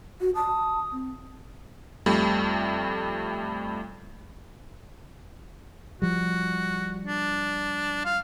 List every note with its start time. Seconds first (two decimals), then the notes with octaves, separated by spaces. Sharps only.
0.21 F#4
0.35 A5 D#6
0.92 C4
2.06 F2 G3 A3
6.02 F3 G3 F#4
7.07 D4
8.05 F5